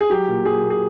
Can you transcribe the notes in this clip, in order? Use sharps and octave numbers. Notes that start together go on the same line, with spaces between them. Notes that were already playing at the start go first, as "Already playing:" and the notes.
G#4
F#3 G4
A#2
F#3 G#4
A#2
G#4